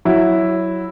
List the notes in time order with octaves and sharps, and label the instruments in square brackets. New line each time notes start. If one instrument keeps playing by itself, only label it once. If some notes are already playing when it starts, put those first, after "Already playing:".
[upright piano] F#3 E4